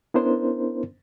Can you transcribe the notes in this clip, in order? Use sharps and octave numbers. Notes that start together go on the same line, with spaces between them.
B3 C#4 D4 E4 A#4 C5